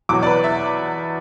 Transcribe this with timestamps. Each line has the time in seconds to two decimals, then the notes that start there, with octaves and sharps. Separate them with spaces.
0.09 E2 B2 F#3 D6
0.23 D5
0.26 B4
0.44 E5